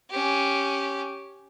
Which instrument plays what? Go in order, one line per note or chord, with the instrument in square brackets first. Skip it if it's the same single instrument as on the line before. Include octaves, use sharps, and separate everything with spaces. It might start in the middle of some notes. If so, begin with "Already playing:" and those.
[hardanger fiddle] C#4 G4